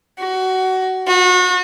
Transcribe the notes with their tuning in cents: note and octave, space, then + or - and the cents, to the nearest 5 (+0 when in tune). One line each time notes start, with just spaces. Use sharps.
F#4 +20
F#4 -35